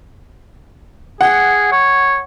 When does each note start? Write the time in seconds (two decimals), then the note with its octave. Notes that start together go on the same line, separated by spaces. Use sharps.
1.21 G#4 F#5
1.72 C#5